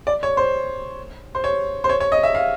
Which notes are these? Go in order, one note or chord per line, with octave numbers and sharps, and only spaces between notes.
D5
C#5
C5
C5
C#5
C5
C#5
C#5
D#5
E5
F5